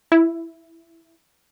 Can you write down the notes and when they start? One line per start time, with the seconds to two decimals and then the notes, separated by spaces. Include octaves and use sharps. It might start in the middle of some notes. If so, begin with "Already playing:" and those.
0.12 E4